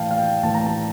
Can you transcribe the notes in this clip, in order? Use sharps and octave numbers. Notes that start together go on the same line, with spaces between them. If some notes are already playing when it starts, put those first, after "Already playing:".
Already playing: A2 E3 F5 G5 A5
F5
G5
A2 E3 A5
A#5
A5